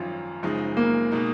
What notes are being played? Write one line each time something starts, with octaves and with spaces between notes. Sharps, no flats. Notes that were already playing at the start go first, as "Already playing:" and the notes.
Already playing: G#1 F#2 F3 F4
F#1 F#2 F3 G#3 D#4
A#3
B2 G#3 D#4